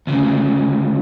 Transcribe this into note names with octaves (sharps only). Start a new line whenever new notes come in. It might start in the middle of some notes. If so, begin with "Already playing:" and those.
D2 C#3